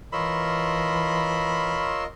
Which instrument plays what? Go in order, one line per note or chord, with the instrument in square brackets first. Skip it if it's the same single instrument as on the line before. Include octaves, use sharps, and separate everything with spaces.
[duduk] E3 [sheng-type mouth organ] F4 A#4 D#5 [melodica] C#5 C6 E6 [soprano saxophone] B5